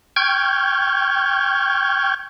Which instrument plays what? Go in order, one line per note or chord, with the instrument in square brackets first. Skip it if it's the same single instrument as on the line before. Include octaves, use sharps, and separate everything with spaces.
[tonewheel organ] G5 C#6 F6 G6 G#6